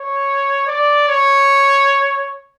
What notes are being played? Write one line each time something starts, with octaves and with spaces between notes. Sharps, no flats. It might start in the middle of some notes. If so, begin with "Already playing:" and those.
Already playing: C#5
D5
C#5